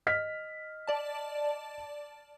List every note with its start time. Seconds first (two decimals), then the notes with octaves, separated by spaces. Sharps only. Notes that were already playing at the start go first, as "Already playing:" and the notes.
0.07 D#5 F6 B6
0.87 D5 A5